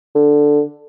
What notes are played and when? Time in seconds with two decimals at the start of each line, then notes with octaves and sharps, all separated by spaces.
0.15 D3